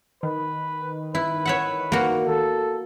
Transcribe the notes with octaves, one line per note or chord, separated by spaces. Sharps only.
D#3 B4
E4 B4
C#5 E5 F#5
A#3 F#4
A4